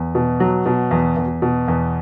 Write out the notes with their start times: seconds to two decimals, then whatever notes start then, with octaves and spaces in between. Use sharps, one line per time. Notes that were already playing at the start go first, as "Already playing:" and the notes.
Already playing: E2
0.15 B2
0.40 F#3
0.66 B2
0.91 E2
1.17 E2
1.42 B2
1.68 E2